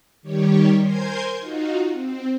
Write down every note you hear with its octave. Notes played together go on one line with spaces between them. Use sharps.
D#3 G3 G4 C#5
A#4 C5 G#5 C6 G6 G#6
D#4 F4 F#4
C4